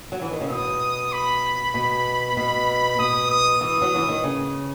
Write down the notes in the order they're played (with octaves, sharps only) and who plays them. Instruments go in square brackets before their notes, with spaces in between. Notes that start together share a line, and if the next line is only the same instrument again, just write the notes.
[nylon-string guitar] F#3
E3
D#3
C#3
[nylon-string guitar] B2 [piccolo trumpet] D#6
[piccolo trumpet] B5
[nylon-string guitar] B2
B2
[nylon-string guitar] B2 [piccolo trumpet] D#6
[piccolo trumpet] D#6
[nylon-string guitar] E3 [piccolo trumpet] D#6
[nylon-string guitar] F#3
E3
D#3
C#3